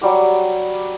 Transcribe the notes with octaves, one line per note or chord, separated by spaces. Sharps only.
F#3 G3 G4 D6